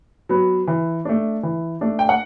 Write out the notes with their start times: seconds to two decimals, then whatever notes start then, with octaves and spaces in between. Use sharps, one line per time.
0.29 F#3 B3
0.68 E3
1.05 A3 D4
1.43 E3
1.81 A3 D4
1.99 G5
2.09 F#5